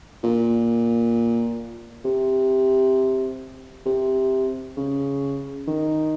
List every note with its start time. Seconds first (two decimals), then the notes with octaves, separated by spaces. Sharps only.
0.24 A#2
2.05 C3
3.86 C3
4.77 C#3
5.68 D#3